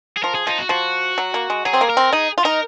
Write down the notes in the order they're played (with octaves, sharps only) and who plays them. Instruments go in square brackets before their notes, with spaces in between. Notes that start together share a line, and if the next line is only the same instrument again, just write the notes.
[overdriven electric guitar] G#4
[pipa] F3 [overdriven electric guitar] A#4
[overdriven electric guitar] G#4
[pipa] F3 [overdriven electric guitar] D#4
[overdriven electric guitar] F#4
[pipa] F3 [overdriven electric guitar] F#4
[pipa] F#3
A#3
G#3
[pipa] F#3 [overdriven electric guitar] G#4
[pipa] C4
A#3
[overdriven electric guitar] A#4
[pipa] C4
[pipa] D#4 [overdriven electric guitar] G#4
[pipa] F4
[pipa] D#4 [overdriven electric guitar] A#4